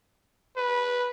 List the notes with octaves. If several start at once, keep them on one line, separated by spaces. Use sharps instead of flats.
B4